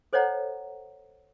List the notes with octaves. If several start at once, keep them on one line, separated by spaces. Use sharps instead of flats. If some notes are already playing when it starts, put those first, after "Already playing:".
A4 C5 C#5 D#5 F#5 A#5